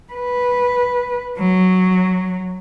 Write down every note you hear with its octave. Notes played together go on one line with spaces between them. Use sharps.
B4
F#3